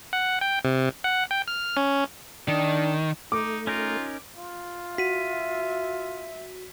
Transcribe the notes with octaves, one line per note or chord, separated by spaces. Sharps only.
F#5
G5
C3
F#5
G5
F6
C#4
D#3 D4
A3 D#4 D6
C#4 D#4 F4 A#4
F4
F#4 E5 B6 D#7